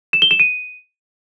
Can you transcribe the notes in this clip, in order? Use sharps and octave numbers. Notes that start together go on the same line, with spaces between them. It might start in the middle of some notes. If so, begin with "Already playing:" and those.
E7
G7
E7
D#7